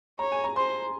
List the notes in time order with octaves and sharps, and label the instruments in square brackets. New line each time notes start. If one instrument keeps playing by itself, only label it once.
[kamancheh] C#5 [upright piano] A#5
[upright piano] G#5
A#5
[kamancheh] C5 [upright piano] C6